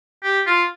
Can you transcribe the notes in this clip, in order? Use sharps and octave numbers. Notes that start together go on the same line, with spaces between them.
G4
F4